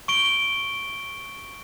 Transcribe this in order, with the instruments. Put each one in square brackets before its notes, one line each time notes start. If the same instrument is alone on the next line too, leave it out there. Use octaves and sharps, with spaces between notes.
[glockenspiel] C#6 D7 G7